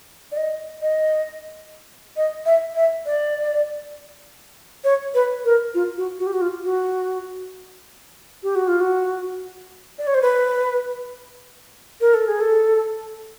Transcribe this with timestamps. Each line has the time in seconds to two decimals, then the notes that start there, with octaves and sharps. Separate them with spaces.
0.32 D5
0.37 D#5
0.82 D#5
2.17 D#5
2.46 E5
2.76 E5
3.06 D5
4.84 C#5
5.15 B4
5.45 A#4
5.74 F4
5.97 F#4
6.19 F#4
6.27 G4
6.33 F#4
6.41 F4
6.64 F#4
8.43 G4
8.56 F#4
8.68 F4
8.81 F#4
9.99 D5
10.07 C#5
10.14 C5
10.22 B4
12.01 A#4
12.14 A4
12.28 G#4
12.41 A4